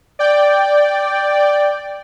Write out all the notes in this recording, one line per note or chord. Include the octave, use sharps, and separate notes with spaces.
D5 G5